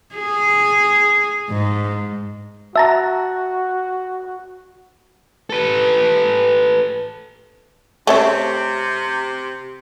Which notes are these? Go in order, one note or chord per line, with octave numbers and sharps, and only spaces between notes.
G#4
G#2
F#4 E5 A5 A#5
A4 B4
C3 A3 C#4 E5